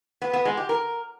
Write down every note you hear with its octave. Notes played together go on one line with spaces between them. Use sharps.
B3
B3
G#3
G4
A#4